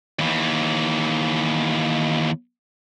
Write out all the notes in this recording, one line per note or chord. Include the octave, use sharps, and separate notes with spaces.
D#2 E3